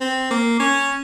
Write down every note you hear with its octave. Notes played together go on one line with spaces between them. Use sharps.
C4
A#3
C#4